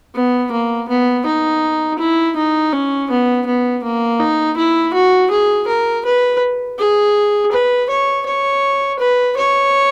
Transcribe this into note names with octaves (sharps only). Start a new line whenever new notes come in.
B3
A#3
B3
D#4
E4
D#4
C#4
B3
B3
A#3
D#4
E4
F#4
G#4
A#4
B4
G#4
B4
C#5
C#5
B4
C#5